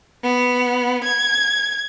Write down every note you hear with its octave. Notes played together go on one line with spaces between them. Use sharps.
B3
G#6